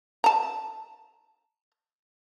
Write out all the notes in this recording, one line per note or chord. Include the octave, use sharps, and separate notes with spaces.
A5 A#5